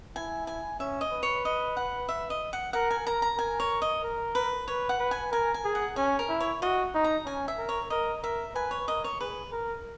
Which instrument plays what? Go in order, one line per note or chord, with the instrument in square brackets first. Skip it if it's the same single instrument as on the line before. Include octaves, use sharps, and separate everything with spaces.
[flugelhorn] E4 [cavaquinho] G#5
[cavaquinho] G#5
[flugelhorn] C#4 [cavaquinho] E5
[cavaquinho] D#5
[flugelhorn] B4
[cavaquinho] C#5
D#5
F#5
E5
D#5
F#5
[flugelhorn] A#4 [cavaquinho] F#5
[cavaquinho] G#5
[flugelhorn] A#4 [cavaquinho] A#5
[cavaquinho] A#5
[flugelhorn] A#4 [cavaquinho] G#5
[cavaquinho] C#5
D#5
[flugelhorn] A#4
[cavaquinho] B4
[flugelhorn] B4 [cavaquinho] C#5
[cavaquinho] F#5
[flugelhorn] B4
[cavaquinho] G#5
[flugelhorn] A#4 [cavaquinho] G#5
[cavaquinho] G#5
[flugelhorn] G#4
[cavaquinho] F#5
[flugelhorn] C#4 [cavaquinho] G#5
[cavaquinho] A#4
[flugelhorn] E4
[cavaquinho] C#5
[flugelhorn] F#4 [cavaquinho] D#5
[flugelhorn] D#4
[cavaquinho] A#5
[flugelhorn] C#4 [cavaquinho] G#5
[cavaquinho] E5
[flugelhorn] A#4
[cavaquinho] C#5
[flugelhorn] A#4 [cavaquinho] D#5
[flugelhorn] A#4 [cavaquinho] E5
[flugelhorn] B4 [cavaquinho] G#5
[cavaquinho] C#5
[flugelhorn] A#4 [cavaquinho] D#5
[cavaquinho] C#5
[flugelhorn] G#4 [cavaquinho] B4
[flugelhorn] A#4